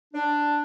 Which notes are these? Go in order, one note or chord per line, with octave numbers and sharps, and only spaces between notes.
D4